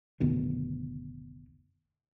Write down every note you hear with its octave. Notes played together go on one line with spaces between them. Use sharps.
F#1 D2 B2 D#3